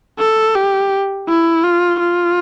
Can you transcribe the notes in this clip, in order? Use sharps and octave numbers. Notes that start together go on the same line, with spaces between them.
A4
G4
E4
F4
F4